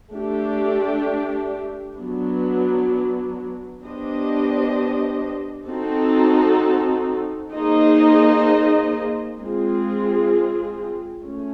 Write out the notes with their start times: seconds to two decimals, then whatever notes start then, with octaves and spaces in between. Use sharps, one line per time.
0.11 A3 D4 G4
1.97 F#3 B3 D4
3.82 B3 D4 G4 C5 D#5
5.67 C4 D#4 F#4 A4
7.53 A#3 D#4 G#4 C5 D#5
9.38 G#3 C4 F4 G#4
11.23 A3 C#4